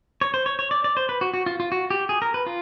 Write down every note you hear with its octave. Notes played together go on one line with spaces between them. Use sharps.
C#5
C5
C#5
C#5
D5
D5
C5
B4
F#4
F#4
F4
F4
F#4
G4
G#4
A#4
B4
F4